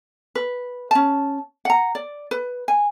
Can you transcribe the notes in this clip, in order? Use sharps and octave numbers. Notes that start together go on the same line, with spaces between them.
B4
C#4 A5
F#5 A#5
D5
B4
G#5